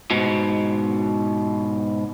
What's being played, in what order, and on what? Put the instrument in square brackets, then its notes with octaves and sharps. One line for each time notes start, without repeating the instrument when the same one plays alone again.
[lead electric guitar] G#2 B2